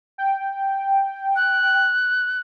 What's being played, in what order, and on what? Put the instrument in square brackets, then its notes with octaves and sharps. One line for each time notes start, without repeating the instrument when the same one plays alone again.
[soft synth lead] G5
[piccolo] F#6